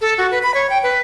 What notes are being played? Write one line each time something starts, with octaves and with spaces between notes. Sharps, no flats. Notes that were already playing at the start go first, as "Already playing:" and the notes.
A4
F#4
B4
B5
C#5
G5
B4